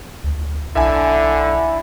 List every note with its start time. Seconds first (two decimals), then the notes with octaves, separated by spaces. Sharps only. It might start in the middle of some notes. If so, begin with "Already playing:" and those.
0.24 D2
0.76 B1 D3 E4 E5 G#5